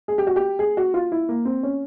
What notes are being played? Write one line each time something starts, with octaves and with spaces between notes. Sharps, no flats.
G#4
G4
F#4
G4
G#4
F#4
F4
E4
A#3
C4
C#4